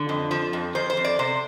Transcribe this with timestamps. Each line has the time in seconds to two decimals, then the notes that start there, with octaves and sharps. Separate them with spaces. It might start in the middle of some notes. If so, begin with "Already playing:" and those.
Already playing: D3
0.09 F2
0.31 F3
0.53 F2
0.75 F2 C5
0.90 C5
0.97 F2
1.04 D5
1.19 C3 C5